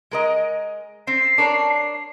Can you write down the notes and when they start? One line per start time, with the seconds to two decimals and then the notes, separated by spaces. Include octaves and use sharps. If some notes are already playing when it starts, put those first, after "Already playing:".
0.11 G#3 A#4 D#5
1.07 C4 C7
1.38 D4 A#4 C#5